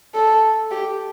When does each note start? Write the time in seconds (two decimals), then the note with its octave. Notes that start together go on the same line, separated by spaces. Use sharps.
0.14 A4
0.71 G4